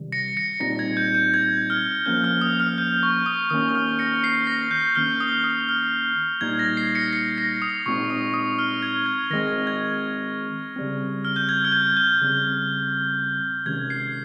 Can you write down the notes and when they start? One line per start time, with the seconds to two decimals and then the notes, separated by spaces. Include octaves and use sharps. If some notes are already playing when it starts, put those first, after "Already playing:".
Already playing: C3 D#3 G3
0.12 A#6 C#7
0.37 A#6 C#7
0.60 A#2 G3 C4 D#4 A#6
0.79 G#6
0.97 G6
1.14 G6
1.34 G#6
1.70 F6
2.06 F3 A#3 C#4 G6
2.24 F6
2.41 D#6
2.60 F6
2.78 G6
3.03 C#6
3.26 D#6
3.50 D#3 A#3 C#4 D#6
3.68 D#6
3.75 F6
3.99 A#6 C#7
4.24 C7
4.47 A#6
4.71 G6
4.95 D#3 A#3 C#4 F6
5.20 D#6
5.44 D#6
5.69 F6
6.41 A#2 G3 A#3 D#4 G#6
6.59 A#6
6.77 C7
6.95 A#6 C#7
7.13 C7
7.38 A#6
7.62 D#6
7.86 A#2 G#3 C4 D#4 C#6
8.10 D#6
8.34 D#6
8.59 F6
8.82 G#6
9.06 G#6
9.30 D#3 G#3 C4 A#6
9.67 G#6
10.76 C#3 G3 C4
11.25 F6
11.36 G6
11.49 G#6
11.65 F6
11.72 G6
11.97 G6
12.21 C#3 G3 C4
13.66 C3 D#3 G#3 C#4 G#6
13.90 C7